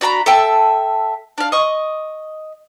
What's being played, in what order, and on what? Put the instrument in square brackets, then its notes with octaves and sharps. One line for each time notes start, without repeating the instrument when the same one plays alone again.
[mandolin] D4 F#4 A#5 B5
A4 E5 G5 A5
D4 F5
D#5 C#6